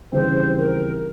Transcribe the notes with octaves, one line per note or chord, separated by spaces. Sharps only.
D#2 C#3 E3 G3 C4 C5
A#4